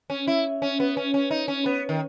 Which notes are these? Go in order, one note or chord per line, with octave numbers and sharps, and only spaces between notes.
C#4
E4
C#4
B3
C#4
C#4
D#4
C#4
B3
D#3